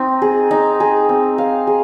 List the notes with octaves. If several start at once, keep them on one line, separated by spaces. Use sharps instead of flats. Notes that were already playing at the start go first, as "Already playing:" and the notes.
Already playing: C4 D#4
G#4
D#4
G#4
C4
F5
G#4